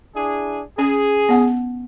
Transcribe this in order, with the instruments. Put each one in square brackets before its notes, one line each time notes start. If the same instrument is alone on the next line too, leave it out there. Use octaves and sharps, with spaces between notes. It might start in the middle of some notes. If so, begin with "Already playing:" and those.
[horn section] D4 E4 G#4
[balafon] C#4 [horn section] G#4
[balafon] B3 F#5